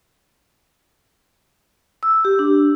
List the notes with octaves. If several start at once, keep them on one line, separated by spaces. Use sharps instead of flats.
E6
G4
D4